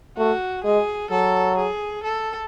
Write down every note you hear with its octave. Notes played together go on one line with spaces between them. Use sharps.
A3 F#4
G#3 G#4
F#3 A4
G#4
A4